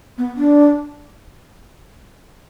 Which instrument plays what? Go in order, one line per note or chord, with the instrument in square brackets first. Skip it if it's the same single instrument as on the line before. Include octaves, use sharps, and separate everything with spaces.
[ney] B3
D4